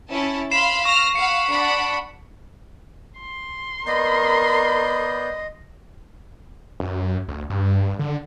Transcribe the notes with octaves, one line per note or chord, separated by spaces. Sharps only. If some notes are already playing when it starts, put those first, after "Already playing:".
C#4 E4 A5
F5 B5 C6 C7 E7
C#6 F6 A#6
F5 F#5 B5 C#7
D4 F#5 B5
C6
B3 A#4 D5 D#5 G6
F#2
D2
G2
D3